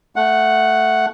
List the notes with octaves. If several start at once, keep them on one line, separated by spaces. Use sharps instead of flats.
A3 F#5